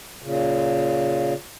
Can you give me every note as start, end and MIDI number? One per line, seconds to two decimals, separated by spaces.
0.23 1.34 46
0.23 1.34 49